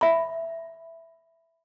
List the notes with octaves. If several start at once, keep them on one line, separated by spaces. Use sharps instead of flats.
E5 B5